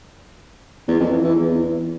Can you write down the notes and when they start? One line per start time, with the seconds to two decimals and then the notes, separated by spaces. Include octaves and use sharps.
0.88 E2
1.00 F2
1.12 E3
1.24 E3
1.36 E2